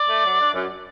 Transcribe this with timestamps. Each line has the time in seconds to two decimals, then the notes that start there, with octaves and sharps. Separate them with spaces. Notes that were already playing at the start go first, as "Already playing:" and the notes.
Already playing: D5
0.09 A3
0.25 F#3
0.40 D4
0.55 F#2